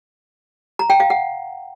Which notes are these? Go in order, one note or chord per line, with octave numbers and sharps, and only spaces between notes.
A#5
G5
F5
F#5